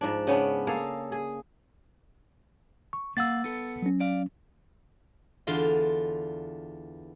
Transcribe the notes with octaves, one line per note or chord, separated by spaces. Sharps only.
G#2 F3 D4
C#3 B3 C#4 D4
A#3 G#4 A4 F5
G#4
C#6
A#3 F5 F#5 E6 A6
B3 A4
F#3 C#4
D5 F5
E2 D3 F4 C6